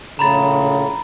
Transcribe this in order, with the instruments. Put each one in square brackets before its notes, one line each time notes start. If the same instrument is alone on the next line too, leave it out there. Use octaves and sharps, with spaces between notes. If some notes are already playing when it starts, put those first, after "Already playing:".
[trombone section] A#1 A2 C#3 [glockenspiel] A#5 B5 A6